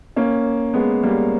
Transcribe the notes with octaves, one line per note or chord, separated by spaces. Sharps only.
A#3 C#4
G#3 B3
G3 A#3